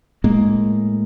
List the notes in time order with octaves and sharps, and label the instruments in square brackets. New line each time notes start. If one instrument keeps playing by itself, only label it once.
[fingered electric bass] A2 G#3 A#3